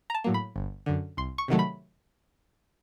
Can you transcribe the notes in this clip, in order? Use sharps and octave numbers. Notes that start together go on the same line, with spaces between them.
A#5
A5
A2 F#3 A#3
B5
G1
F#2 D3
C2 C6
C#6
C3 D#3 F#3 A3
B5